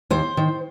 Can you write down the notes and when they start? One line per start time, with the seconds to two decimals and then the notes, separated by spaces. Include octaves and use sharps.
0.10 D#2 C5
0.37 D#3